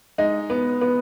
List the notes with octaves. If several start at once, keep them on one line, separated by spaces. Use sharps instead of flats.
G#3 D#4
B3
B3